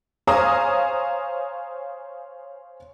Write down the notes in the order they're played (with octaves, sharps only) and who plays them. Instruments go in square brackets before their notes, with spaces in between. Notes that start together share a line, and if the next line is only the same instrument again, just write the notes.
[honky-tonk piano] C5 C#5 F5 G#5 A#5 D#6